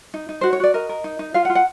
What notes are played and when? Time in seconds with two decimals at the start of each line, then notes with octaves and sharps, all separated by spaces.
0.14 D#4
0.29 D#4
0.41 F#4 C5
0.53 C#5
0.60 F#4 D5
0.74 A#4 D#5
0.89 A#4
1.04 D#4
1.19 D#4
1.34 F4 F5
1.45 F#5
1.50 F4
1.55 F#5